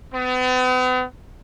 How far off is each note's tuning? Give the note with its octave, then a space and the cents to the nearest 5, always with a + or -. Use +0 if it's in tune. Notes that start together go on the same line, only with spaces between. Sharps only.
B3 +45